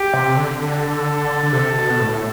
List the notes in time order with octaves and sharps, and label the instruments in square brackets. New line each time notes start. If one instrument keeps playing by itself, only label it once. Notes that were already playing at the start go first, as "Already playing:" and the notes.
Already playing: [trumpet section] G4
[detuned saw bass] C3
D3
[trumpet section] A4
[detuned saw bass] D3
C3
B2
A2